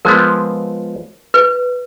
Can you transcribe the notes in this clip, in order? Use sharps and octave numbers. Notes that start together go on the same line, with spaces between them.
F3 G#3 B3 A#4
B4